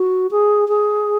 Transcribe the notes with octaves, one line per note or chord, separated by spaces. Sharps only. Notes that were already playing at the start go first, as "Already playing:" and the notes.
Already playing: F#4
G#4
G#4